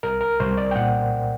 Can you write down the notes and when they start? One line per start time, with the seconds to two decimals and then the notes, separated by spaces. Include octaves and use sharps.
0.03 C2 A#4
0.21 A#4
0.40 C2 C5
0.57 D5
0.71 G5
0.76 A#2 F#5